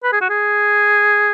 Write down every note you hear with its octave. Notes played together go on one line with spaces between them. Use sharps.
B4
G#4
F#4
G#4